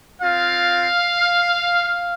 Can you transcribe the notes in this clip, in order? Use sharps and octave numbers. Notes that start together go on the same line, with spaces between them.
C4 F4 F5